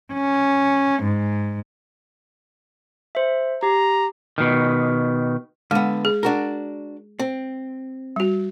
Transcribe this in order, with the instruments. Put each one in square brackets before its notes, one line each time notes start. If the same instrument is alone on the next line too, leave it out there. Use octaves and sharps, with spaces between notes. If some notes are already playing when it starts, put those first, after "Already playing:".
[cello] C#4
G#2
[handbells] C5 E5
[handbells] G4 [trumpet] A#5
[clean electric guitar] B2 D#3
[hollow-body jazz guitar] D3 B3 [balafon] G#3
[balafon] G#4
[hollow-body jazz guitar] D4 F#4 A#4
C4
[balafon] G3 F#4